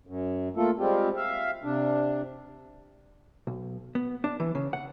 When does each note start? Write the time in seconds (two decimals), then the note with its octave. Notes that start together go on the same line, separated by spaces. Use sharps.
0.07 F#2
0.57 A3 A#3 F4 A4
0.79 G3 G#3 C4 F4 G4
1.16 E5 F5
1.64 C3 D4
3.47 B1
3.95 B3
4.24 D4
4.40 E3
4.55 C#3
4.73 F#5